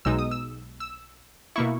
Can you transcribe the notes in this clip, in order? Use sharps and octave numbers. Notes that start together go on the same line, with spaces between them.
B1 B2 G#3 D#4 E6
D#6
E6
E6
B2 A#3 E4 C#6